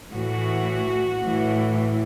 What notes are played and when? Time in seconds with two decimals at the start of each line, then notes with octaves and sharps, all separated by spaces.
0.13 A2 E3 F#4
1.23 A2 E3